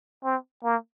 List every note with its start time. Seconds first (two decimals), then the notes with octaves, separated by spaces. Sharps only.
0.24 C4
0.64 A#3